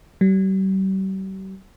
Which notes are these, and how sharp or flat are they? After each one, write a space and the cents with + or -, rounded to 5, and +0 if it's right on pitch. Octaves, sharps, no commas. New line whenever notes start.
G3 -40